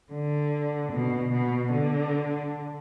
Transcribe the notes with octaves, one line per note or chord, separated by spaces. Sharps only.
D3
B2
B2
D3